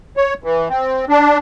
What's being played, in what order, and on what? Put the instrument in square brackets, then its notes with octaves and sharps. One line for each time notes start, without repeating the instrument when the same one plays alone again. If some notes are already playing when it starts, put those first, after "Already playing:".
[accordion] C#5
E3
C4
D4